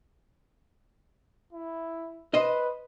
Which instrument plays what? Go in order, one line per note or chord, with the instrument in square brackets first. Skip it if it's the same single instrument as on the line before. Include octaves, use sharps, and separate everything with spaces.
[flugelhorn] E4
[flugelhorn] B4 [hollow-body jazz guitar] C5 D#5